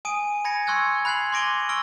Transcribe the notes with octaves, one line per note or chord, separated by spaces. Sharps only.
G#5 D#6 D7 D#7
G#5 B5 G#6 A#6 C#7
C6 C#6 E6 F#6 G#6
B5 F#6 G#6 C7 F#7
C6 D6 A#6 D7 D#7 G7
C#6 E6 F6 A#6 D7 G7